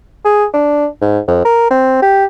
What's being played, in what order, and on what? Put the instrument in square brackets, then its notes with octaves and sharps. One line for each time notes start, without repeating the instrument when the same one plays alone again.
[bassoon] G#4
D4
G#2
F2
A#4
C4
G4